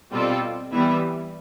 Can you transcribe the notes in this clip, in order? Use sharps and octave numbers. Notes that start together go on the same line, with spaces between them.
B2 G3 C4 F4 A4
E3 G3 B3 E4